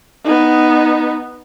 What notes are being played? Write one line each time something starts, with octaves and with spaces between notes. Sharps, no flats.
B3 D#4